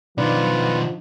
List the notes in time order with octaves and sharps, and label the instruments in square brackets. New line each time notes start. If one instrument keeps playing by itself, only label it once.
[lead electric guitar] B2 D#3 [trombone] F3 [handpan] D4 D#4 D5 [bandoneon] F4 B4